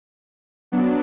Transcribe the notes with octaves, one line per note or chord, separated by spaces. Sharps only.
F#3 B3 D4